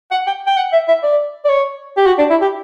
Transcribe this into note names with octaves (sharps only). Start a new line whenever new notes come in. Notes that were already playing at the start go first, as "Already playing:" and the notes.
F#5
G5
G5
F#5
E5
E5
D5
D5
C#5
G4
F#4
D4
E4
G4